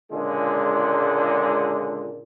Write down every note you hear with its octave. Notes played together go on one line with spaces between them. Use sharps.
C#2 A#2 D3 G#3